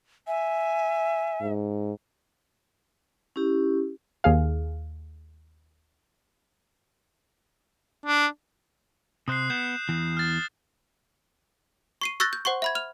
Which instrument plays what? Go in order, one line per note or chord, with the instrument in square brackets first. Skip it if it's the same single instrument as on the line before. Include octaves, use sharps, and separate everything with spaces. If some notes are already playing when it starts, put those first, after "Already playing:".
[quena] E5 [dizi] G#5
[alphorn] G#2
[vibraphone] C#4 E4 G4
[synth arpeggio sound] D#2 G#4 F5
[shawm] D4
[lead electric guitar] C3 C5 [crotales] D#6 F#6 C7
[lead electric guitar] B3 [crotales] G6 E7
[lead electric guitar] E2 E3
[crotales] F6 A6
[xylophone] C#6 C7 D#7
C#6 E6 F#6 G6 A6 A#6
G6
C5 F#5 C6 C#6
E5 B5 G#6
F6 F7